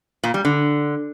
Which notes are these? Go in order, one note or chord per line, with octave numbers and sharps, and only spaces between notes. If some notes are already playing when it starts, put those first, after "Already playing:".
A#2
G3
D3